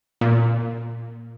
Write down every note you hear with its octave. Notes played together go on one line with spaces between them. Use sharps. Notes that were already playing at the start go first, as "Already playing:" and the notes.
A#2